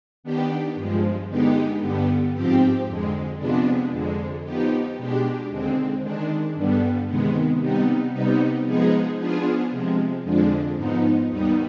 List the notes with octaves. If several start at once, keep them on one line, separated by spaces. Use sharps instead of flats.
D#3 B3 D4 G4
G2 F3 G#3
D3 G#3 B3 D#4 G4
G2 D3 G3 B3
G#2 F3 C4 G4
F2 D3 G#3
C3 F3 G#3 B3 D4
F2 D3 G#3
F3 B3 D#4 G4
B2 G#3 D4 G4
D#2 D3 G#3 C4
D#3 G#3 D4
G2 D3 G3 B3
C3 D#3 G#3 B3
C3 G3 B3 D#4
C3 G3 B3 D#4
F3 G#3 B3 D#4 G#4
F3 B3 D4 F4 G#4
C3 F3 G#3
F2 D3 F3 G#3 D4
G#2 F3 B3 D#4
D#2 D#3 G3 B3 D#4